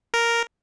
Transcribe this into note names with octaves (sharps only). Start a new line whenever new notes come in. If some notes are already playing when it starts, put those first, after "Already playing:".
A#4